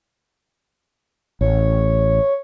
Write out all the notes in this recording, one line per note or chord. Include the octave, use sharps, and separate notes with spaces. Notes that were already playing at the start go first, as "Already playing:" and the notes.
A1 C#5